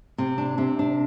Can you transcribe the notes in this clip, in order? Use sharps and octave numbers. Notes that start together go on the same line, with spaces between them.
C3
D4
C3
D4